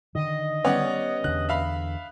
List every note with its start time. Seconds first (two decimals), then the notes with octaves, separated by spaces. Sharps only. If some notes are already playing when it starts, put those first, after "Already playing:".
0.15 D3 D#3 D#5
0.64 G3 B3 C#4 C#5 D5 F#5
1.24 E2 D3 F#6
1.49 E5 F5 B5